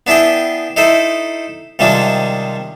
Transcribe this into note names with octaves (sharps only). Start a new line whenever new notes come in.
B3 D4 E4 G#4 G5
D#4 E4 A4 C5
C3 D#3 F3 G3 G#3 D4